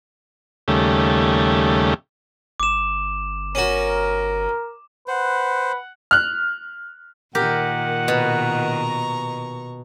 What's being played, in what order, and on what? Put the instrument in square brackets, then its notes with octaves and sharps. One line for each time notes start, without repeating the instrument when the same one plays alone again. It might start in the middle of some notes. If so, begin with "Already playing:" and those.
[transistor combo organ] D#2 C#3 G3 A3
[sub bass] G1 [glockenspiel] D6 E7
[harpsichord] C#4 F#4 [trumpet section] A#4
[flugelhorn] B4 [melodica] C5 [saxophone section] F#5
[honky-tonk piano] F6 F#6
[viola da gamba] A#2 D#3 [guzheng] G4 A#4 [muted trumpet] F#5
[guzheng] B2 [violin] A#5 C#6